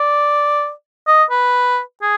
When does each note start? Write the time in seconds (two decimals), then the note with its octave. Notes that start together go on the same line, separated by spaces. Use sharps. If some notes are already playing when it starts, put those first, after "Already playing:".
Already playing: D5
1.07 D#5
1.30 B4
2.02 G#4